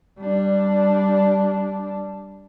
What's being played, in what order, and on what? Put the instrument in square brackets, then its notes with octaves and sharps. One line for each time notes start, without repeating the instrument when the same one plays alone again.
[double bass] G3 D4